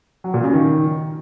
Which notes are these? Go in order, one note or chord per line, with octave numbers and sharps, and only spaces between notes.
F#3
A#2
C#3
D#3